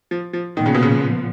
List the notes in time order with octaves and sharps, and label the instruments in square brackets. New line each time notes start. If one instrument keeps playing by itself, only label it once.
[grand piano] F3
F3
[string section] A#2 F3 B3 [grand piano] D#3
[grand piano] C#3
B2
C#3